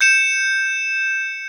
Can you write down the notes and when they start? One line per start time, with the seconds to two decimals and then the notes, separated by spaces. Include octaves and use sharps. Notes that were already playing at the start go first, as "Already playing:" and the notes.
0.01 G6 C#7 E7